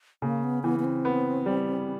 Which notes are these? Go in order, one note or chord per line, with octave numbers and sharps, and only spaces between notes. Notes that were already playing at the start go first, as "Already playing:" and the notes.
C#3 A#3
B3
E3 B3
B3
C4
B3
G3